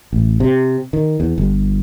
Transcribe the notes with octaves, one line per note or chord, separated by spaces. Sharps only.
A1
C3
D#3
E2
G1